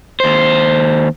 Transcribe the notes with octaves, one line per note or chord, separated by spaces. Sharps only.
D#2 C5